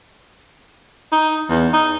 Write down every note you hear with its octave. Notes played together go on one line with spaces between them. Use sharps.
D#4
E2
D#4